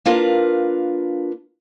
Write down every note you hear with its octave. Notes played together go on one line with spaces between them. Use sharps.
A#3 D4 F4 A#4 B4